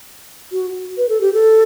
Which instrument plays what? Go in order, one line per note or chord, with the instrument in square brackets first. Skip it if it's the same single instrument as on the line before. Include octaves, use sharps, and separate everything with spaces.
[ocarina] F#4
B4
A4
G4
A4